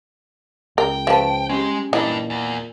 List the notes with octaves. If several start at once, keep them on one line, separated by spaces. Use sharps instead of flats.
C#2 A#4 G5
F3 B4 E5 A5
G#3 C#4 G4
A#2 E3 G3 D4 D#4
E2